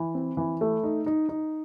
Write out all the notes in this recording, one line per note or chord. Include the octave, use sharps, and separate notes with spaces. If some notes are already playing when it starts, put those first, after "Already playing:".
Already playing: E3
C4
E3
A3
D#4
D#4
D#4